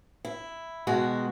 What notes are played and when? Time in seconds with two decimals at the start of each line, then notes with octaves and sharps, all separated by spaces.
0.25 E4
0.87 B2 D#3 G#3 F#4